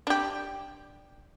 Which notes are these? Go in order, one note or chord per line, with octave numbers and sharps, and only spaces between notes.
D4 G4